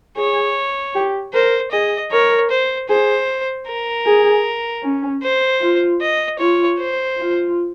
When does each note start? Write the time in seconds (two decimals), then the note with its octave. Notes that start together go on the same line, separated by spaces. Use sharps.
0.16 G#4 C#5
0.95 G4
1.33 A#4 C5
1.72 G#4 D#5
2.11 A#4 C#5
2.50 C5
2.88 G#4 C5
3.67 A#4
4.06 G#4
4.83 C#4
5.22 C5
5.61 F4
6.01 D#5
6.39 F4 C#5
6.78 C5
7.18 F4